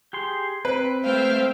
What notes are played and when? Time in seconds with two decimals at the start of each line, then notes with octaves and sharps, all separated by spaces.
0.13 G4 G#4 C6
0.65 C4 B4
1.04 A3 C5 E5 F5 G5